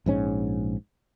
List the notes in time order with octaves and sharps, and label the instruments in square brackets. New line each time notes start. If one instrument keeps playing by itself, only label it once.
[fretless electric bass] A#1 G#2 C#4